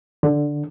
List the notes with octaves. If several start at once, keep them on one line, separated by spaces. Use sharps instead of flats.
D3